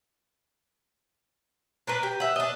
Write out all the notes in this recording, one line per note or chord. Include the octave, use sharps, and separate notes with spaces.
D4 A#4 B4
G4
E5 F#5
D4 D#5